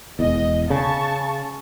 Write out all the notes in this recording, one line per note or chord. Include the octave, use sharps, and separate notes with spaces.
E1 E2 D#5
C#3 A5 C#6